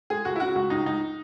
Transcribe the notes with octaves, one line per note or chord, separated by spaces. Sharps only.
G#3 G#4
C#2 F#4
E4
C#3 F#4
C#2 F#4
C#2 D#4
C#2 D#4